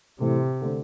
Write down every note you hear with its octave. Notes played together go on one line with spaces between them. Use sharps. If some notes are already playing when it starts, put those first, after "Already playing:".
A2 C3 E3 A3 C4
D3 A3 C4